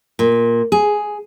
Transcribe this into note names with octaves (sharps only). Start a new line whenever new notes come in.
A#2
G#4